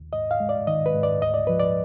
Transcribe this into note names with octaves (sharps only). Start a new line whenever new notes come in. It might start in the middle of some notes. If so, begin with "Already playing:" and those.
Already playing: D#2
G#2 D#5
F5
G#3
D5
D#3 D#5
B4
G#2
D5
D2 D#5
D5
F3 B4
D5